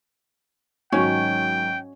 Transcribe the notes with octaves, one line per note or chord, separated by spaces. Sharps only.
G#2 D#3 F#3 C#4 F#4 C#5 G5